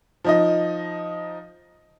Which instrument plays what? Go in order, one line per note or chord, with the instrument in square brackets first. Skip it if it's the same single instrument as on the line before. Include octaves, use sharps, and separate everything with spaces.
[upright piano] F3 D#4 D#5